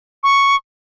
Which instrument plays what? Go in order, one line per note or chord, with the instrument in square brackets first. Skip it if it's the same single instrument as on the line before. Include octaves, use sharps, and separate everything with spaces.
[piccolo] C#6